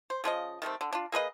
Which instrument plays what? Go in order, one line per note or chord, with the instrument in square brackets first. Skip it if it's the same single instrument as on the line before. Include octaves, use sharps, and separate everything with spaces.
[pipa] C5
C#3 F3 C#4 D#5
D#3 G3 A3 C4
D3
D4 F4
A#3 G#4 B4 D#5